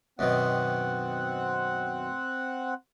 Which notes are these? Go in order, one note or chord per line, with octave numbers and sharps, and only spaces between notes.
F#2 B2 D#3 C4 F#5